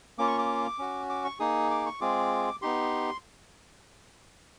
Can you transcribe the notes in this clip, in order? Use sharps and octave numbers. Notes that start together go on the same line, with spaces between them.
A#3 C#4 F4 D6
C#6
D6
C#4 F#4
D6
C#6
A#3 D#4 G#4 D#6
D6
C#6
G#3 C4 F4 G#4 D6
B3 D#4 G4 C6